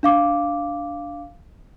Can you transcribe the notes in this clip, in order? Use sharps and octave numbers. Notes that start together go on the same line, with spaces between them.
D4 F5 D6